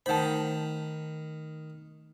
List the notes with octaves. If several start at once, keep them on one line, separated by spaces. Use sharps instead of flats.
D#3 A3 D#4 C5 F#5 A5 B5 G6